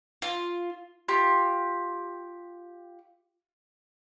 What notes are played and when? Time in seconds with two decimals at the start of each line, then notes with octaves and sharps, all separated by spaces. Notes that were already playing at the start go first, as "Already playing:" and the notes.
0.22 F4
1.08 F4 G4